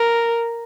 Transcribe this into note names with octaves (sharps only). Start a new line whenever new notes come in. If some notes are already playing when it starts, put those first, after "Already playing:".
Already playing: A#4